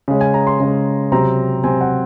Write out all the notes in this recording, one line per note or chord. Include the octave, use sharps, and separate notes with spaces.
C#3 G#3 C#4
G#5
A#5
C6
C#3 G#3 C#4
C3 F#3 C4 A#5
C3 F#3 C4 G#5
F#5